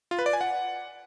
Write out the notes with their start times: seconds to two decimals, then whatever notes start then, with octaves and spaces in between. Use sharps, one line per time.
0.11 F4
0.19 B4
0.26 D5
0.33 G#5
0.41 F#5